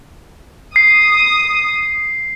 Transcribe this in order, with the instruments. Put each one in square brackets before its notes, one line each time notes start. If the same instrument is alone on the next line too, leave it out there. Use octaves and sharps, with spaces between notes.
[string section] D#6 [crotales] C7